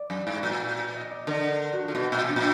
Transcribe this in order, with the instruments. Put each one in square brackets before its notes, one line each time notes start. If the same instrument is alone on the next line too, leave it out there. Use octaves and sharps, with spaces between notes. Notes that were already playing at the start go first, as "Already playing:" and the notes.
Already playing: [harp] D5
[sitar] F#2
G#2
A#2
[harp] D#5
D5
[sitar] D3 [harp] A#4
[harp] F#4
[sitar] D3 [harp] F4
[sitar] B2
A#2
[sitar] B2 [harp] D4
[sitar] A#2